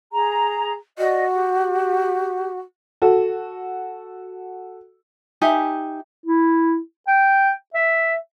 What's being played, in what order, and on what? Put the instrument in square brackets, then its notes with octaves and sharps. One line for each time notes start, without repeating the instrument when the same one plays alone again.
[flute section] G#4 A#5
[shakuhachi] F#4 [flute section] D5 D#5
[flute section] G4
[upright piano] F#4 A4
[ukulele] D#4 G4 E5 G#5
[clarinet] E4
G5
E5